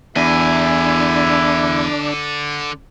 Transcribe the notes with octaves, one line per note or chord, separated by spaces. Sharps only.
E2 D3 D4 E4 G#5